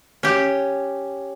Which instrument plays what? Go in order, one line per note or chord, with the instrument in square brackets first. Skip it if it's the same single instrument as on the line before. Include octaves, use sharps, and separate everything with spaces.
[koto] C#4 G4